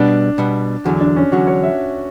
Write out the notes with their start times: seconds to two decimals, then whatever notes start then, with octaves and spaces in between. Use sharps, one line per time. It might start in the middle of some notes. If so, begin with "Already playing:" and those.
Already playing: B2 G3 B3 D4
0.38 B2 G3 B3
0.85 E2 D3 F#3 F#4
1.00 D4
1.17 C#4
1.32 E2 D3 F#3 F#4
1.47 C#5
1.63 E5